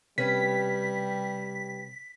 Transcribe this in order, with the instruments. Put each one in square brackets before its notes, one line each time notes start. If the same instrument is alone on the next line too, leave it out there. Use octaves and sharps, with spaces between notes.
[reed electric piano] C3 [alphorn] G3 [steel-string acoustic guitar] C#4 G4 B4 [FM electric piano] B6